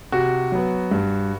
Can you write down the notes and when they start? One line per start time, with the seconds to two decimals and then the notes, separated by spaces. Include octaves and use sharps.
0.12 C3 F#4
0.52 F#3 B3
0.91 G2